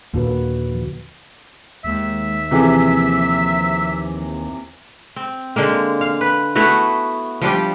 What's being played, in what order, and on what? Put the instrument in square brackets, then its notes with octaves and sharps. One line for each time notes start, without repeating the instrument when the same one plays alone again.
[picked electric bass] D#2 A#2 D3 [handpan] A#3 F#4 B4
[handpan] F3
[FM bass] D#2 [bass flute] G#3 [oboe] E5
[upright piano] C3 E3 G#4 [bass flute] F3
[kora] C4
D3 G#3 A#3
F5
B4
A3 B3 E4 F#4
F3 G3 D4 G4